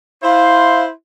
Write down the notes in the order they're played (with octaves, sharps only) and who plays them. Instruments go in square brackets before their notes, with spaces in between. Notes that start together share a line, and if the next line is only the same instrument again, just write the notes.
[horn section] E4 C5 [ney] F5